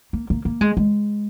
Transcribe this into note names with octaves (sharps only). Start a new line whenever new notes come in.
A#3
A#3
A#3
G#3
G#3